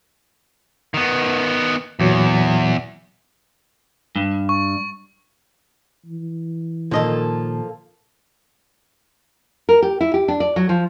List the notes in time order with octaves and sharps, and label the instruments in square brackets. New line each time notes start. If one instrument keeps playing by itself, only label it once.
[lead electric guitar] D#3 B3
[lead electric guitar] E2 [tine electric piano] A#2 E3 F#3
[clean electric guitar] G2
[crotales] C#6
[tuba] E3
[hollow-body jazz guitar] A#2 D#3 [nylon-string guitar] F3 D#5 [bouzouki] A#3 F4 A4
[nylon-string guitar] A#4
G4
E4
G4
D4
D5
F#3
F3